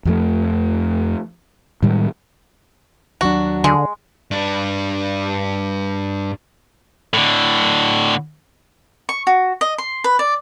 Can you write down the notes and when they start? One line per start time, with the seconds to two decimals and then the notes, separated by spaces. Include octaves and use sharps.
0.05 F2 F3 A3
1.83 A2 D#3 G3 G#3
3.21 D#2 F#3 D4 F#4
3.64 D3 G#3
4.31 G2 D4
7.14 A2 D3
9.09 C#6
9.27 F#4
9.61 D#5
9.78 C6
10.04 B4
10.19 D5